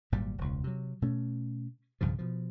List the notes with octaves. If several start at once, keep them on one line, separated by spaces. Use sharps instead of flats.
G#1 A#2 F#3 G3
E1 C#2
C3 F#3
B2 A3 C#4
B1 G2 C#3 F3
B2 F3